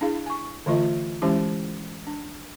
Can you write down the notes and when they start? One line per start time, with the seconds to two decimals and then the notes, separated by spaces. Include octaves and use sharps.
0.01 D4 E4 G#4 F5
0.26 G#5 C#6
0.66 D3 E3 A3 F4 D#5
1.22 E3 G#3 C#4 E4 G4
2.07 D4